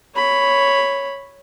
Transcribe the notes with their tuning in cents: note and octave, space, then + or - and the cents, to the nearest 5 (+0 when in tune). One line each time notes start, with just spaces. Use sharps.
C#5 +0 B5 +0